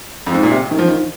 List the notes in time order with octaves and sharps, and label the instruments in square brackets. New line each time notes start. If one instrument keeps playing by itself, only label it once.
[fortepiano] F2
G#2
A#2
C3
D#3
F3
D#3